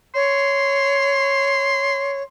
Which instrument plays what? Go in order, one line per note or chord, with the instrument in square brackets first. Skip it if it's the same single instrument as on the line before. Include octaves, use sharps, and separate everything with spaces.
[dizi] C#5 [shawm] C6